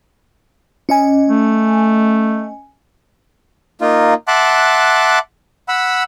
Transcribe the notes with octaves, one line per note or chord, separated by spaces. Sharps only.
C#4 D#5 G#5
A3
A#3 D#4 F4
E5 F#5 A5 C6 D6 F#6
F#5 B5 E6